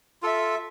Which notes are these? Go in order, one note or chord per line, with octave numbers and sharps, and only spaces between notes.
F4 A4 E5